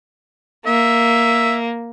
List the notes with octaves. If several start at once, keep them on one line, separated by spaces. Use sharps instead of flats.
A#3 E5